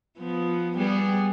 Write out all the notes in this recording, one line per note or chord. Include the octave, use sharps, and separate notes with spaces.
F3 B3
G3 B3 G#4